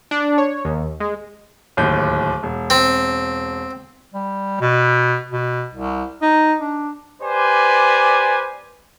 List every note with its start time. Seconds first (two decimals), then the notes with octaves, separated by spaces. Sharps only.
0.11 D4
0.38 C#5
0.65 D#2
1.00 G#3
1.77 D1 D#2 G6
2.43 E1
2.70 C4
4.14 G3
4.61 B2
5.31 B2
5.74 C2
6.22 D#4
6.59 D4
7.22 G4 B4 C5 D5 G#5